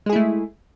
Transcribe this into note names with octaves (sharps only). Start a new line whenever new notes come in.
G#3 A3 E4 G#4